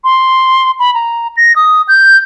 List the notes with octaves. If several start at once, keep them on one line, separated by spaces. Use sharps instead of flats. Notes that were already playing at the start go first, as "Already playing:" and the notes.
C6
B5
A#5
A#6
D#6
G6